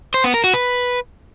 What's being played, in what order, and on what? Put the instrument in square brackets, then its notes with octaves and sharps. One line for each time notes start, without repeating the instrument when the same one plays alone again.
[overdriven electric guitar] C5
B3
A#4
F#4
B4